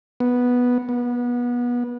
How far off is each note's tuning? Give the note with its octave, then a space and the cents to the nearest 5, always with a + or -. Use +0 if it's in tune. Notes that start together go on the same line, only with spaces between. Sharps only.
B3 -5
B3 -25